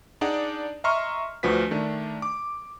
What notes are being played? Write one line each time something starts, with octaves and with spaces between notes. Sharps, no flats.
D4 D#4 G#4 D5 F#5
D#5 E5 A#5 C6 C#6 F6
D2 F3 F#4 B4 B6
D#3 A3 D4
D6